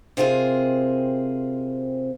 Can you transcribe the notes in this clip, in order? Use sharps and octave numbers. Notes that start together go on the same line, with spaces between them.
C3 C4 E4 F4 G#4 A#4